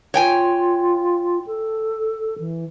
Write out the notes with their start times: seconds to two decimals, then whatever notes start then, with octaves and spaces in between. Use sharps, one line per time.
0.14 F4 C#5 G5 G#5
1.46 A4
2.39 E3